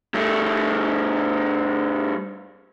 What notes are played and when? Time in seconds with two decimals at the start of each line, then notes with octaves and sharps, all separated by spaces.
0.14 G2 A3